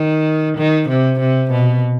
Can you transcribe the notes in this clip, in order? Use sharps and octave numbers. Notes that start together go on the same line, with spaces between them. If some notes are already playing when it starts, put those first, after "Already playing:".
Already playing: D#3
D#3
C3
C3
B2